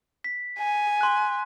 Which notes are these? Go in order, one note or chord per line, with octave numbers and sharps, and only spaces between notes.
B6
G#5
C6 F#6